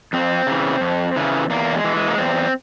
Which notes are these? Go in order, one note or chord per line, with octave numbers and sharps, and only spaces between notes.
F2 C4
C#3 E3
F2
C#3 E3
E2 A#3
G#3
E3
G#3
A#3
E2 C4